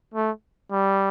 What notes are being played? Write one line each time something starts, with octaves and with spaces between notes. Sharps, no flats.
A3
G3